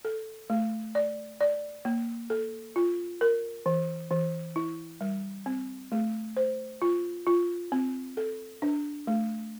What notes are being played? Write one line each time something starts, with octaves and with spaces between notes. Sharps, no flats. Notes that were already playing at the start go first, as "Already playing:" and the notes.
A4
A3
D5
D5
A#3
A4
F4
A#4
E3
E3
E4
G3
C4
A3
C5
F4
F4
C4
A4
D4
A3